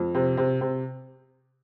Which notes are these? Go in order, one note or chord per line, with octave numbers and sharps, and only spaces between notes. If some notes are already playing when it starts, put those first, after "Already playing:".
Already playing: F2
C3
C3
C3